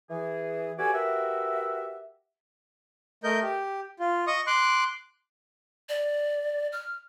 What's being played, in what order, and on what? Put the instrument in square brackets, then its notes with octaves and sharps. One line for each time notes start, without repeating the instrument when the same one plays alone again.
[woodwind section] E3 G#4
B3 F#4 G4 A4 D5 G#5
F#4 G4 A#4 B4 E5
[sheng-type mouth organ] A3 A#4 D#5 G6
G4
F4
D#5 C#6 D#6
C6 D6 F#6
[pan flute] D5
F6